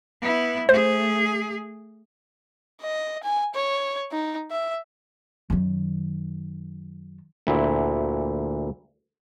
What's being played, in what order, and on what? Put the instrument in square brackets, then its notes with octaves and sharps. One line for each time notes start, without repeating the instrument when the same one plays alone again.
[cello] B3 E4
[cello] A3 G#4 [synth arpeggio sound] C5
[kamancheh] D#5
G#5
C#5
D#4
E5
[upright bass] F#2 D#3
[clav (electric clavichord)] D2 A#2 E4